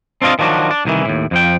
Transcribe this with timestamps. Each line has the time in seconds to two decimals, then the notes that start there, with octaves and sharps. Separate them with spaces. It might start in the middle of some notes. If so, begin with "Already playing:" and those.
0.22 C4 D4 F4 D#5 F5
0.39 D#3 F3 F#3 D4 F#4
0.71 D4
0.85 C2 D#3 E3
1.05 D#2 A2
1.31 F2 F3 G5